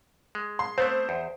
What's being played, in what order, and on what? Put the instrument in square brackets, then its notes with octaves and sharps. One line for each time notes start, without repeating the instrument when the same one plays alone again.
[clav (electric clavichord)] G#3
[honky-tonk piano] C6
[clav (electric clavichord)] A3 B3 C4 [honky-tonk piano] C5
[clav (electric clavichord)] E2